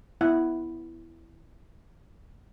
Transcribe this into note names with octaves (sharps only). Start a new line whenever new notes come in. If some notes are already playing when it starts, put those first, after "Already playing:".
B3 E4 F#5